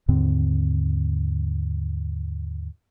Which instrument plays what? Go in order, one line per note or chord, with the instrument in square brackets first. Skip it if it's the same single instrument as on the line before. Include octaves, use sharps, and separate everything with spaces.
[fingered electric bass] D#2 G#2 D3 C4